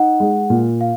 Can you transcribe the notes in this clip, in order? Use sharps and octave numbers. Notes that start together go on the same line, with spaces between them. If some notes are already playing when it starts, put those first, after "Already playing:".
Already playing: D#4 F#5
G#3
A#2
F5